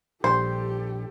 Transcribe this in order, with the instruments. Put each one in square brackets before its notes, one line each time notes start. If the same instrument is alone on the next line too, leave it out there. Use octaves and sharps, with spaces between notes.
[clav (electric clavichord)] A#1 G3 [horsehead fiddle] G4 A4 [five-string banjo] C5